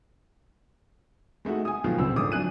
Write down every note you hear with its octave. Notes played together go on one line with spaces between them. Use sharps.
G#3 A3 D#4 F#4
G#5 D#6
B2 D#3 F3 F#3 F4
D#1 C#2 C#3 C4 E6
G#1 A#2 D3 D6 D#6
F3 F#3 D4 G#5 F#6 D#7